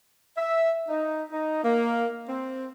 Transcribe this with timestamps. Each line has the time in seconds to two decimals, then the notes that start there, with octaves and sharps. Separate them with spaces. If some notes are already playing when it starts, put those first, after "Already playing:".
0.37 E5
0.88 D#4
1.30 D#4
1.63 A#3
2.28 C4